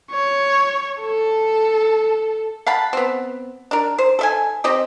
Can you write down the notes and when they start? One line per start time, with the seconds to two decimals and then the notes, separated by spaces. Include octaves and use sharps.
0.11 C#5
1.01 A4
2.66 F5 F#5 A5 B5
2.93 B3 C4
3.71 D4 A#4
3.98 C5
4.19 A4 E5 G#5
4.64 C4 G4 D#5